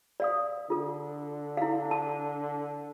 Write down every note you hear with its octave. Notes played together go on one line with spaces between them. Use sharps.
D5 F5 D#6
D3 F4 A4
E4 F5
A5